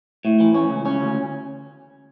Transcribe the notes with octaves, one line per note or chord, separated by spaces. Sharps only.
A2
E3
C#4
C#2
C#4
D2